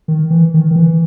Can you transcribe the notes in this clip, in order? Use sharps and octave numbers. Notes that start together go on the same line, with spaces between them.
D#3
E3
D#3
D#3
E3